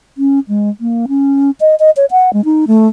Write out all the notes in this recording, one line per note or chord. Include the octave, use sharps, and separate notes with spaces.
C#4
G#3
A#3
C#4
D#5
D#5
C#5
F#5
G#3
D#4
A3